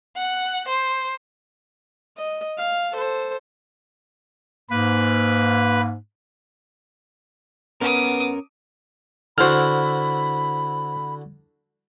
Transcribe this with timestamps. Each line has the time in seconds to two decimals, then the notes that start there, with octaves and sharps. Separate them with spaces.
0.16 F#5
0.68 C5
2.17 D#5
2.58 F5
2.92 A4 C5
4.70 G#2 A#3 B4
7.81 B3 C#4 A#4 D6 D#6
9.38 D3 E4 F#4 C5 B5 F6